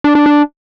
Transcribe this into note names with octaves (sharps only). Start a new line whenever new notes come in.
D4
D4
D4